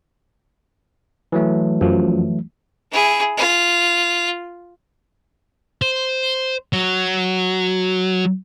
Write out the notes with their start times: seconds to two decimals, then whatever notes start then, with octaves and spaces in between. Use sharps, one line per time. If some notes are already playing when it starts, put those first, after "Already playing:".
1.32 E3 F#3 A3
1.81 F#2 F3
2.91 E4 G#4
3.37 F4
5.82 C5
6.73 F#3